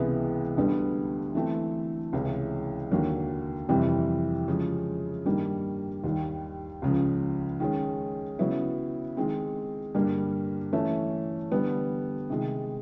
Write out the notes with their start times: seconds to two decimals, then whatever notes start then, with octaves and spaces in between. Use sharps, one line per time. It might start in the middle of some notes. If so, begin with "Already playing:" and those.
Already playing: C#2 C3 E3 G#3 B3
0.57 D2 D3 G3 B3
1.35 E3 A3 C4
2.13 C#2 C3 E3 G#3 C#4
2.91 D#2 D3 F#3 A#3
3.69 F2 C3 E3 G3 C4
4.48 C#3 F3 G#3 C#4
5.25 G2 D#3 G3 A#3
6.04 D#2 D#3 G3
6.82 C#2 C#3 F3
7.60 D#3 G#3 C#4
8.39 C#3 F#3 B3 E4
9.17 D#3 G#3 C4
9.94 G2 D3 G3 A#3
10.73 E3 A3 C#4
11.52 D3 G3 B3
12.30 C3 D#3 G#3